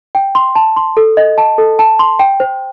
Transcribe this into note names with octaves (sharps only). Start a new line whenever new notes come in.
G5
C6
A5
C6
A4
D#5
A5
A4
A5
C6
G5
C5